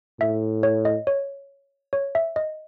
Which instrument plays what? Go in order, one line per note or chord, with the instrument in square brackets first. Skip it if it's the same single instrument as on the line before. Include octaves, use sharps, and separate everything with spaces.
[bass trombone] A2 [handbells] E5
[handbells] C#5
D#5
C#5
C#5
E5
D#5